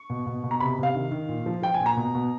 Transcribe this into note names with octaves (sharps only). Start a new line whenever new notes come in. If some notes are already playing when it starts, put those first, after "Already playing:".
Already playing: C#6
B2
B2
B2
A#5
C3 B5
C3 F5
D#3
D#3
A#2
F3
F3 G5
G#5
A#2
A#5
B2
B2